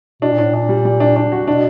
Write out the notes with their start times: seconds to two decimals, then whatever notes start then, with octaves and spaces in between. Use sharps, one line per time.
0.22 B2 D4
0.33 A#2
0.38 A2 D4
0.52 A#2 D4
0.69 G3
0.85 G3
1.00 D4
1.16 D4
1.32 F#4
1.48 B2 D4